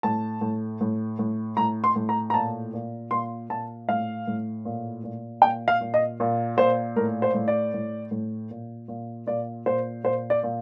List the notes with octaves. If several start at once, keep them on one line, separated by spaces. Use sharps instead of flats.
A2 A5
A2
A2
A2
A2 A#5
C6
A2
A#5
A#5
A#2 A5
A#2
A#2 C6
A#2 A5
A2 F5
A2
A#2
A#2
A#2 G5
F5
A#2
D#5
A#2
A#2 C5
A2 A#4
C5
A2
D5
A2
A2
A#2
A#2
A#2 D5
A#2 C5
A#2 C5
D5
A#2